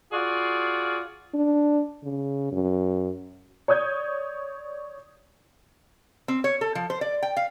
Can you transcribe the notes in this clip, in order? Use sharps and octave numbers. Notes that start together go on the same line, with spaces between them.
F4 F#4 G#4 D5
D4
C#3
F#2
C#5 D5 D#6 G6 G#6
C4
C#5
A4
F3
C5
D5
G5
F5